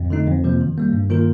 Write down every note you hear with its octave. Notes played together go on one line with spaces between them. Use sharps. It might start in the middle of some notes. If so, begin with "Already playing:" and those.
Already playing: F2
D3 A3 D#4
F2
C3 F3 A#3
D#3
G3 A#3
G2
D#3 A#3 F4 A#4